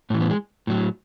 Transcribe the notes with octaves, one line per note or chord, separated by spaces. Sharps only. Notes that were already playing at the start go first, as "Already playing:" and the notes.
A2 E3 A3
B3
G#3
A2 F#3